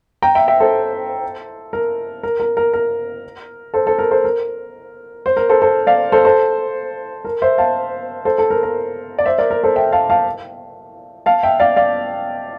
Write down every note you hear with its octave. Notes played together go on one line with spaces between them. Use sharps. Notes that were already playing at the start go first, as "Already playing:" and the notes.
G5 A#5
E5 G5
E5 G5
A4 C5
A#4
A#4
A#4
A#4
A#4
A4 C5
A4 C5
A#4
A4 C5
A#4
C5
A#4
A4 C5
A4 C5
D5 F5
A4 C5
A4 C5
A#4
C5 E5
F5 A5
A4 C5
A4
A#4
A#4
D5
C5 E5
A#4 D5
A#4
A4 C5
E5 G5
F5 A5
F5 A5
F5 A5
E5 G5
D5 F5
D5 F5